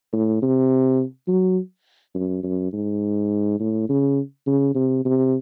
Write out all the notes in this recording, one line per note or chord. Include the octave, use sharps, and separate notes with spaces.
A2
C3
F#3
F#2
F#2
G#2
A2
C#3
C#3
C3
C3